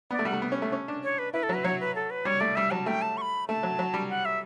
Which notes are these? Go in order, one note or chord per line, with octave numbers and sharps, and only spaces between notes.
B3 D5
A3
G3 F#5
A3
B3
C#4
A3
C#4
D4
C#5
B4
E4 B4
A4
F#3 B4
F#3 C#5
B4
A4
B4
G3 C#5
A3 D5
G3 E5
F#3 A5
A3 G5
A5
C#6
B5
A3 A5
F#3
F#3
G3
F#5
E5